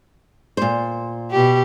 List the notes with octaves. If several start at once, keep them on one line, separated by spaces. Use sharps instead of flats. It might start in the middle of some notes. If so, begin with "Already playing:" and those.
A#2 C5
B2 G4